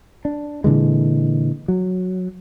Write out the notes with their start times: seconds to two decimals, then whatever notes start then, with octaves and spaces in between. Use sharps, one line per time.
0.25 D4
0.64 A#2 D3 E3 G#3
1.68 F#3